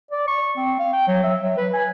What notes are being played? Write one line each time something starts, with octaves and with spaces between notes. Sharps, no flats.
D5
C#6
C4
F5
G5
F#3
E5
F#3
B4
G#5